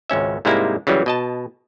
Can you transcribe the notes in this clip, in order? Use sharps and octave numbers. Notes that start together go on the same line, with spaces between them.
G#1 C#2 C#4 E5
G#2 C3 G3 G#3 A#3 E4
C#3 E3 F#3 G3
B2 D#5 A5